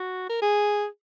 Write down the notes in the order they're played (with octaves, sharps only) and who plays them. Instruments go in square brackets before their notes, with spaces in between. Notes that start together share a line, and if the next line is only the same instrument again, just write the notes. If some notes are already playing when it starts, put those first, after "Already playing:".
Already playing: [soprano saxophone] F#4
A#4
G#4